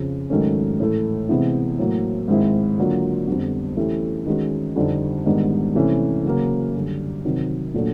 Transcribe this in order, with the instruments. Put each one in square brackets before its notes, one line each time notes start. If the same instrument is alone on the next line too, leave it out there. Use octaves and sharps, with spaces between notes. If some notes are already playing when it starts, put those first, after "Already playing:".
Already playing: [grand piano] F2 C#3 F3
G#2 D#3 F#3 A3 C#4
A2 E3 A3
C3 E3 G#3 B3 E4
A2 F#3 A#3
G#2 D#3 G#3 C4 E4
D3 F#3 A#3 D4 F4
F2 D3 G3 B3
E3 A3 C#4 E4 G4
D#3 G#3 C#4 F#4
F2 D3 G3 C4 D#4
G#2 D#3 G3 B3 D4
C3 E3 A3 C#4
C#3 F#3 A#3
F#2 D3 G3
C3 D#3 F#3
A#2 F#3 A3 D4